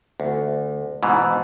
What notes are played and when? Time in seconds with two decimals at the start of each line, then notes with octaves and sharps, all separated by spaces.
0.20 D2
1.03 G#2 B2 E3